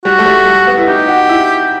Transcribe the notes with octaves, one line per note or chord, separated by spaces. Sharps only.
G3 F#4
A3
G3
A3
B3
E4
D#4 G4
F#4
E4